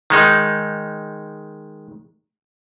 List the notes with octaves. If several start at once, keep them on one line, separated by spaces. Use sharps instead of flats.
D#3 G#3 D#4